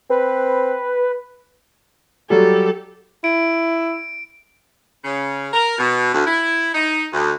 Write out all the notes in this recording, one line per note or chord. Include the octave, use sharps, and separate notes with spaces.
C4 B4
F#3 G3 G4 A4
E4 D7
C#3
A#4
B2
D2
E4
D#4
D2